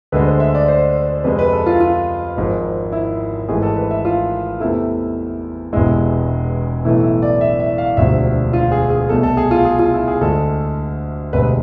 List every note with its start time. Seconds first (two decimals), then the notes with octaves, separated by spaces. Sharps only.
0.12 D2 D3 G#3 B4
0.26 C5
0.40 E5
0.55 D5
0.68 C5
1.24 F2 C3 G#3 B4
1.39 B4
1.52 A4
1.66 F4
1.80 F4
2.36 G#1 G#2 F3
2.92 E4
3.49 G#1 G#2 E3 A3 G#4
3.62 A4
3.76 B4
3.91 E5
4.05 F4
4.60 E2 C3 E3 A3 E4
5.73 E1 E2 C3 G#3 E4
6.85 B1 A2 E3 A3 E4
7.03 E4
7.22 D5
7.41 E5
7.60 E5
7.78 F5
7.97 E1 D2 C3 F3 E5
8.53 F4
8.72 G#4
8.90 G#4
9.09 C2 B2 A3 A4
9.23 A4
9.37 G#4
9.51 F4
9.65 G#4
9.79 F4
9.93 E4
10.08 G#4
10.21 D2 D3 G#3 A4
11.33 E1 D2 C3 G#3 B4